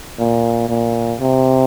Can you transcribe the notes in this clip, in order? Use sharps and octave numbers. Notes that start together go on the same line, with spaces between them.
A#2
A#2
C3